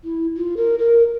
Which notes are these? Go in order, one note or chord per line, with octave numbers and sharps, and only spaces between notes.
E4
F4
A#4
A#4